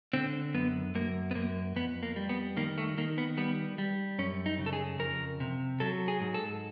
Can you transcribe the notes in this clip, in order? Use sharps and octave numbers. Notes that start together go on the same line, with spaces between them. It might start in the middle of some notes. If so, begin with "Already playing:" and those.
D3 C4
F#2 B3
F#2 A#3
B3
F#2 A#3
F2 B3
A#3
G3
B3
D#3 A#3
A3
D#3 A#3
B3
G3 B3
G3
F#2 C#4
D#4
C#3
A4
G#4
F2 A#4
C3
F#3 A4
G#4
G#2
A4